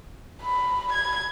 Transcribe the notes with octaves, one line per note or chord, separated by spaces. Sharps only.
B5
G#6